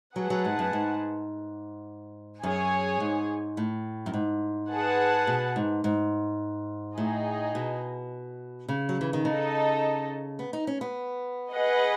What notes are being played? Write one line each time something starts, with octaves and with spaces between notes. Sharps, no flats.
F#3 G#4 B4 F#5 A5
F#3
G#2
F#2
G#2
F#2 G#4 C#5 G#5
G#2
A2
F#2
G#2
G#4 B4 F#5 A5
B2
G#2
G#2
A2 D#4 G#4 D#5
B2
C#3
F#3
E3
D#3
C#3 D#4 A4 D#5 A5
B3
D#4
C#4
B3
G#4 B4 D#5 F#5